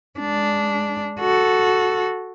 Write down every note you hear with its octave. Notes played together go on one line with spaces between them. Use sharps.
G#3 D4
F#4 A4